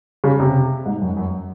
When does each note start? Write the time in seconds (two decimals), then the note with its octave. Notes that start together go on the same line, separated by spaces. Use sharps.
0.24 C#3
0.40 C3
0.86 G#2
1.02 F#2
1.17 F#2